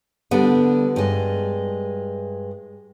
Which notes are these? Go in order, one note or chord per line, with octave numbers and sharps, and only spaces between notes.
D3 G3 B3
G2 G#3